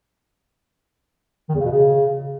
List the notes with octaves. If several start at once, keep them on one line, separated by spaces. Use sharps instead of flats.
D#3
E2
C#3
B2
C#3